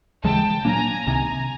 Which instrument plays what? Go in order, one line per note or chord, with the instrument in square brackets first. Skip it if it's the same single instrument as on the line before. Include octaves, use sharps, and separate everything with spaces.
[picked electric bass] D#2 C#3 E3 G#3 [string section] G5 A5
[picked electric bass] A#2 F#3 A#3 D4 [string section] G#5 A#5
[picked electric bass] C2 C3 D#3 [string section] G#5 A#5